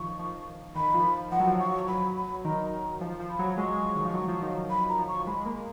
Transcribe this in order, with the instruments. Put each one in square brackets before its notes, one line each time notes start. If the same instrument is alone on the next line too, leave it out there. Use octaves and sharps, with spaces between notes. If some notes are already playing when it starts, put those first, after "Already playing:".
Already playing: [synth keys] D#3 F3 [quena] C#6
[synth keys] F3
[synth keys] D#3 [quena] B5
[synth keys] F3
[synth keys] F3 [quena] F#5
[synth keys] F#3
F3
[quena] C#6
[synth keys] F#3 [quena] B5
[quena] B5
[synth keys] D#3 [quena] A#5
[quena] A#5
[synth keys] F3
F3
[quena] B5
[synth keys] F#3
F#3
[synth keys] G#3 [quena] C#6
[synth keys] D#3
F3
F#3
F3
D#3
F3
[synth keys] D#3 [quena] B5
[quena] A#5
[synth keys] F3
[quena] C#6
[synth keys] G#3 [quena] B5
[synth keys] A#3